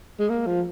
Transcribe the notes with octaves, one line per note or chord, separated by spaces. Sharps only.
G#3
A#3
F3